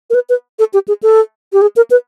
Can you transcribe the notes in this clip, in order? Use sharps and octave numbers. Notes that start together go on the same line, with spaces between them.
A#4
B4
B4
A4
G4
G#4
A4
G4
G#4
A#4
B4